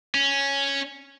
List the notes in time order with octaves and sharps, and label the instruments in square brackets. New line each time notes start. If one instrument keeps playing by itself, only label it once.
[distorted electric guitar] C#4